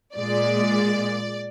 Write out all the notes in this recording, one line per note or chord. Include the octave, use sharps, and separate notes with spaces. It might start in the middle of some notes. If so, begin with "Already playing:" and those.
A#2 G#3 D5